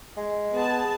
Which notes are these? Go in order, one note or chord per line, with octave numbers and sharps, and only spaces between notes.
G#3
B3 G#4 A5